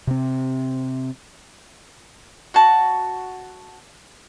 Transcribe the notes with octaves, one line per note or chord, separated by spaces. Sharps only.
C3 C4
F#4 A5